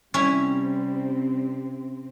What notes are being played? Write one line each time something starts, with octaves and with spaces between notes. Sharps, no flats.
C3 G3 C4 C#4 E4